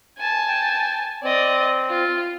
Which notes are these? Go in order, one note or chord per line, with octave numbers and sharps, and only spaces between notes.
G#5 A5
G5
C4 D5 D#5
F4